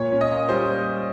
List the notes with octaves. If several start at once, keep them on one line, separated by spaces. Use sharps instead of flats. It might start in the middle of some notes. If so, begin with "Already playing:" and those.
Already playing: A#2 C#5
C#4
D#5
A#3
G3 C5